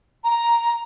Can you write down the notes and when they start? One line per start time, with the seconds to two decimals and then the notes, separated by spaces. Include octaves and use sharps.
0.25 A#5